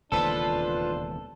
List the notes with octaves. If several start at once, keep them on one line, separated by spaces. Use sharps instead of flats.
E1 D#2 C#3 D4 F4 A4 B4 C5